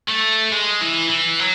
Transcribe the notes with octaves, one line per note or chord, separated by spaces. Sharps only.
A3
G#3
E3
E3
F#3